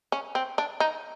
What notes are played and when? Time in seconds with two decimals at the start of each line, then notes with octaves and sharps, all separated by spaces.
0.12 C#4
0.35 C4
0.58 D4
0.80 D#4